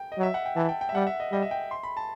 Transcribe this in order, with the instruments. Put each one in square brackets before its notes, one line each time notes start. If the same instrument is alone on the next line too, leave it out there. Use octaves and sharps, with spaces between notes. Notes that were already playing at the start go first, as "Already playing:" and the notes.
Already playing: [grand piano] G5
D#5
[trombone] F#3
[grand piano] E5
F#5
G5
[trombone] E3 [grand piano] A5
[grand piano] G5
G5
E5
[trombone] G3 [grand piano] F#5
[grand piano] E5
D#5
[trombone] G3 [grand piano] D#5
[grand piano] E5
G5
C6
B5
A5